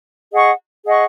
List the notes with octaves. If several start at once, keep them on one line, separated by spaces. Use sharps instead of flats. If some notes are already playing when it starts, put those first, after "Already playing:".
G#4 D#5 F#5 C#6
G#4 D#5 F#5 C#6